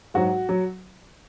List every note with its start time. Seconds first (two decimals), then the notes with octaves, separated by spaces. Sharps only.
0.14 G#2 F#3 F#4
0.49 F#3